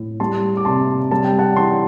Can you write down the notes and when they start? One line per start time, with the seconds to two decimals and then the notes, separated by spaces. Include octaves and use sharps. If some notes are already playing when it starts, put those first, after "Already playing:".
Already playing: A2
0.20 G3 A5 C6
0.57 D6
0.65 C3 A5 C6
1.11 G3 A5
1.24 G5
1.39 F#5 A5
1.56 E3 A5 C6